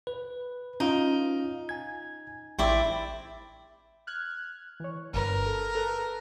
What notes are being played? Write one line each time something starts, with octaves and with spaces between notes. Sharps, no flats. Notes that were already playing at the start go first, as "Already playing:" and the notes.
B4
C#4 D#4 F4 F5
G#5 G#6
A1 C4 E4 D5
F6 F#6 G#6
E3 C#5
G1 G2 A#4 B4
A4
A4 B4